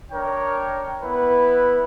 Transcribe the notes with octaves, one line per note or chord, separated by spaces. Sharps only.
D4 A#4 C#5 G5
B3 E4 B4